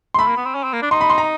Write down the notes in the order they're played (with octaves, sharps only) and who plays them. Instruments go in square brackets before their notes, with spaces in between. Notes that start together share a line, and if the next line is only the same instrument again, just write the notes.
[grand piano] C6
[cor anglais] A3 [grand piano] B5
[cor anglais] A#3
B3
C4
C#4
C4
A#3
D4
[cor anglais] D#4 [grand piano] C6
[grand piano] B5
C6
A#5